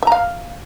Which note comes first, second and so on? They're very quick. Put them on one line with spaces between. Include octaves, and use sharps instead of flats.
E5 A#5 F5